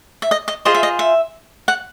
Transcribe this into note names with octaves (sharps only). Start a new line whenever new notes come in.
E5
D#5
D#5
F4 G#4 C5 D#5
E5
D#5
E5
F#5